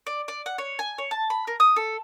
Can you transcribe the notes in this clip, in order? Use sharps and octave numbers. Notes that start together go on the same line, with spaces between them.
D5
D5
F#5
C#5
G#5
C#5
A5
B5
A#4
D#6
A4